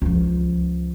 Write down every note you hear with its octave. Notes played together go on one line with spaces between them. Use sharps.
C#2 F3